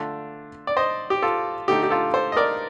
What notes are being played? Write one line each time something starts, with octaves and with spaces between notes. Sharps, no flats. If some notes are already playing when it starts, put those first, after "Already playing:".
Already playing: D3 A3 D4 F4
D5
C5 D#5
G4
F4 A4
D3 A3 D#4 G4
G4
F4 A4
A4 C5
D#5
A#4 D5